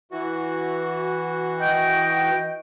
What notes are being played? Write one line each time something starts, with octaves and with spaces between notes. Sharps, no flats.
E3 F#4
D#5 G5